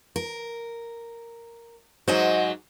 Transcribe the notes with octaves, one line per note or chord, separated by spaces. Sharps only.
A#4
G#2 F#3 F#4 C5 D#5 G#5